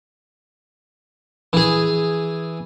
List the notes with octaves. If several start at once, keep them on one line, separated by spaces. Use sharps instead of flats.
E3 G#4